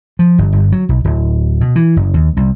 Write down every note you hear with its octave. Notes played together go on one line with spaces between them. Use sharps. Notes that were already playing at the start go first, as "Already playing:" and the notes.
F3
G1
G1
F#3
B1
D1
B2
E3
F#1
D#2
C2